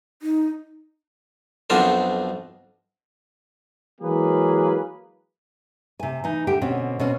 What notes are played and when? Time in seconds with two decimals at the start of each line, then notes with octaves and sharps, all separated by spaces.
0.22 D#4
1.70 B1 F2 B2 D4 A#4 C5
4.01 E3 F#3 G#3 A#3 G#4 B4
6.00 C3 G#5
6.24 E3 D#4
6.47 D3 G4 G5
6.61 B2 D3 C4 C#4
6.99 B2 C4 C#4